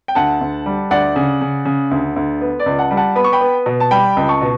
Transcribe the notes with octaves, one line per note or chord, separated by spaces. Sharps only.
G5
D2 F#5 A5
D2
G3
D2 D5 F#5
C#3
C#3
C#3
D2
D2
B3
D5
C#2
F#5 A5
G3
F#5 A5
B3 B5
C#6
G5 B5
B3
B2
A5
G3 G5 B5
C#2
A5 C#6
B2